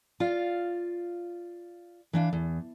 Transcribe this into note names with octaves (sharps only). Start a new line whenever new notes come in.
F4 D5 F5
E3 D4 F5
E2